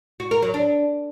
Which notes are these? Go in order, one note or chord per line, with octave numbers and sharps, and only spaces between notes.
F#4
A#4
F#3
D4